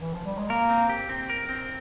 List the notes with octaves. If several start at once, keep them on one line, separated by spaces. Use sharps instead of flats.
E3
F3
G3
G#3
A#3 A#4
C4
G4
C4
A#4
C4